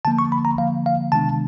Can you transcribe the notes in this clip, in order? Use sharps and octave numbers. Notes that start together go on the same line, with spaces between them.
D3 F3 A#3 A5
C#6
B5
A#5
D3 F3 A#3 F5
F5
C3 D#3 G#3 B3 D4 A5